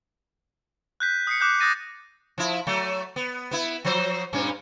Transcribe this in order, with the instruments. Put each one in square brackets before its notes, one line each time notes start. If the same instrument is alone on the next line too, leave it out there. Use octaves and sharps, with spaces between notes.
[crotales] F#6 G6 B6
D#6 C7 C#7
D6 F#6 G6
D#6 F#6 G6 A6 A#6 D#7
[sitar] F3 E4
F#3 A3
B3
B3 E4
F3 F#3 C5
G2 A#2 C#4